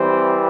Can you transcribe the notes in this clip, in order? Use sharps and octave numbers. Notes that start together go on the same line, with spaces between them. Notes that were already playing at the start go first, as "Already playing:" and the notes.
Already playing: E3 G3 C4